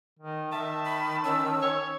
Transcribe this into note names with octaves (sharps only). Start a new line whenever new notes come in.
D#3
D#3 E5 A5
B5
C#4 E6
C#5